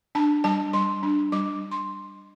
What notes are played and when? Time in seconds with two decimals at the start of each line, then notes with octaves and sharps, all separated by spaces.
0.15 D4 A5
0.44 G3 A5
0.73 G3 C6
1.03 D4
1.32 G3 D6
1.62 D4
1.71 C6